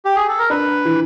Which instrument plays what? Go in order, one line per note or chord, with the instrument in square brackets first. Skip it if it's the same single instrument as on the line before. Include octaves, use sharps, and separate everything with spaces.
[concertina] G4
G#4
A4
A#4
[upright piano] D4 [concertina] B4
[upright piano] E3